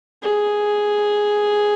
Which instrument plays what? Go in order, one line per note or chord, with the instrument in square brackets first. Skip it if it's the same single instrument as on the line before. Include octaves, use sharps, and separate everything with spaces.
[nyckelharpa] G#4